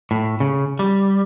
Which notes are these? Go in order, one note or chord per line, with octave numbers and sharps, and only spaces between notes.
A2
C#3
G3